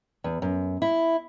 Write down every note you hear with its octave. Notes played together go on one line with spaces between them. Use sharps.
E2
F#2
E4